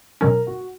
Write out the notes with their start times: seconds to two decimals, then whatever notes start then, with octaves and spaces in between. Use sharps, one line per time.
0.21 B2 F#3 C#4 A#4
0.47 F#4